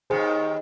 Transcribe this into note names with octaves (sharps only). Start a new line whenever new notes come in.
D#2 D#3 G#4 C5